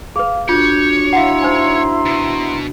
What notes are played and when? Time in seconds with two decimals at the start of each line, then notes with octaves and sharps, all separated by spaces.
0.16 G#4 B4 F5
0.49 D4 F4 F#4 C#5 G6
1.13 E4 F5 F#5 A#5 C6
1.43 D#4 C5 G#5
2.05 B2